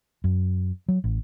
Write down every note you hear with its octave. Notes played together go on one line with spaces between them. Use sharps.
F#2
F#3
A1